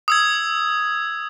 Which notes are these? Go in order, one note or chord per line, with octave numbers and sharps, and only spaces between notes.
D#6 E6 G#6